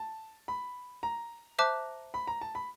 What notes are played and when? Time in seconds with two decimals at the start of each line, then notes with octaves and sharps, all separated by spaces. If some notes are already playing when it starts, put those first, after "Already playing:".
Already playing: A5
0.48 B5
1.03 A#5
1.59 C5 E5 A5 D6 F#6
2.14 B5
2.27 A#5
2.41 A5
2.55 B5